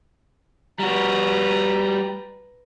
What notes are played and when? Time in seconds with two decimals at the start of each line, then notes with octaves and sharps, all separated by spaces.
0.79 G3 F#4 B4 A#5